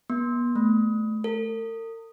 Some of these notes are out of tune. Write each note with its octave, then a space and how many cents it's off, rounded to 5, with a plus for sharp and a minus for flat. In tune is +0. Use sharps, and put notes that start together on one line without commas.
B3 -35
A3 -15
A#4 -45